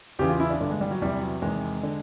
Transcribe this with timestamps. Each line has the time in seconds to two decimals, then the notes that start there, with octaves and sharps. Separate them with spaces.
0.19 E2 C#3 E3 G4
0.29 F4
0.40 E4
0.50 D4
0.60 G2 D3 D4
0.70 G#3
0.81 G3
0.91 F#3
1.01 E2 C3 E3 G3
1.22 F#3
1.42 E2 C3 D#3 G#3
1.83 D3